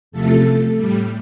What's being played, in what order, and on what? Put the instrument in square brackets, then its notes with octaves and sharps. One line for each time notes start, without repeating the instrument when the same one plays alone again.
[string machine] E2 C3 F3 A3 A4
A2 G3